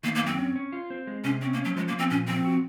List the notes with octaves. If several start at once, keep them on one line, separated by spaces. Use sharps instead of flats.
D#3 A#3
A#3
F#2 C4
C#4
C#4
F4
C4
G#3
C3 C#4
C4 C#4
A#3
C#4
F#3
F3 G#3
A#3
F3
C4
A#2 C#4
F3 C4
F#4